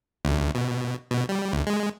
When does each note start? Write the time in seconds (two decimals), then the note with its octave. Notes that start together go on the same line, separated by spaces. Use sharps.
0.25 D2
0.55 B2
1.11 B2
1.29 G3
1.53 D2
1.67 G#3